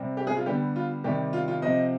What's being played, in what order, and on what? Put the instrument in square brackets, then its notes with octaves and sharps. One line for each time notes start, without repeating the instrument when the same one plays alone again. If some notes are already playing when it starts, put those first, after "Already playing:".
Already playing: [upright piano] C3 G3 C4
G4
G#4
F4
D3 G3 B3 G4
F4
C3 D#3 G3 G4
F4
F4
C3 F3 C4 D#5